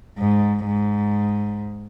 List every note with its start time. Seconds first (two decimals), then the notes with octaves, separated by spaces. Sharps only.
0.19 G#2
0.66 G#2